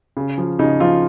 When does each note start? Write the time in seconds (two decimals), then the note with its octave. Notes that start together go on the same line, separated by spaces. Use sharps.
0.17 C#3
0.38 F3
0.59 C#3 D#4
0.80 F3 F4